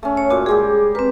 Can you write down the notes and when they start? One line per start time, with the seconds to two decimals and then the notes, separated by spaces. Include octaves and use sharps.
0.03 A3 C#4
0.17 C#5
0.30 A#2 F#4 D6
0.46 G3 G#3 G4 G#4
0.95 C4 A#4 B4